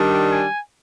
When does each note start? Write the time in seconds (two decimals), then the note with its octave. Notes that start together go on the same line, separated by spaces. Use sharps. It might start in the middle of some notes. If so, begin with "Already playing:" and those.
Already playing: D#3 G3 D4
0.30 G#5